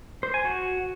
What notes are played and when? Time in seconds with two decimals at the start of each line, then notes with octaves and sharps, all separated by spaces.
0.23 C5
0.34 G#5
0.45 F#4